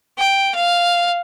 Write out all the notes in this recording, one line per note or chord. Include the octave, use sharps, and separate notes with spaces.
G5
F5